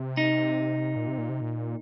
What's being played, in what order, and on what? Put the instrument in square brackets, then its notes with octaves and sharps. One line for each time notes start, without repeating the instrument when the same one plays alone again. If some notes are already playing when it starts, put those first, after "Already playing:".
Already playing: [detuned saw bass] C3
[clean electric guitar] D#4
[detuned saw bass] A#2
C3
A#2
C3
A#2